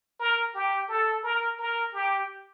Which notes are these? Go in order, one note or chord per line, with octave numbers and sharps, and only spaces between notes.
A#4
G4
A4
A#4
A#4
G4